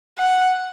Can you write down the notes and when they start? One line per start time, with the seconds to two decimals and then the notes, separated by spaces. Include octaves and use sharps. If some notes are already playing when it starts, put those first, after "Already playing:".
0.19 F#5